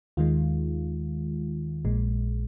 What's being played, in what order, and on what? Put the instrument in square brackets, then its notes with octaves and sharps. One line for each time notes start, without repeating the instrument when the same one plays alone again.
[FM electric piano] D#2 D#3 G#3 F4
A#1 A#2 G#3